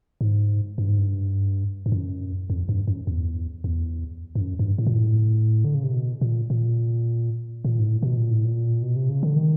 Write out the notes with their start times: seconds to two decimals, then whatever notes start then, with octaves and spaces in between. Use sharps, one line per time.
0.21 G#2
0.78 G2
0.89 G#2
0.98 G2
1.86 G2
1.92 F#2
2.50 F2
2.69 G2
2.88 F#2
3.07 E2
3.64 E2
4.35 G2
4.41 F#2
4.59 G2
4.78 A2
4.87 A#2
4.95 A2
5.64 D3
5.74 C#3
5.83 C3
5.93 B2
6.21 A#2
6.50 A#2
7.65 A#2
7.79 G#2
7.84 A2
8.03 B2
8.17 A#2
8.31 A2
8.45 A#2
8.83 B2
8.96 C3
9.09 C#3
9.23 D3
9.36 D#3